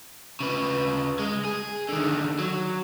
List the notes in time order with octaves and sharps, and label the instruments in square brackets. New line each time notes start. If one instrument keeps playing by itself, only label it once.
[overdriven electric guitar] C#3 B4
G#3
G#4
D3 D#3
F#3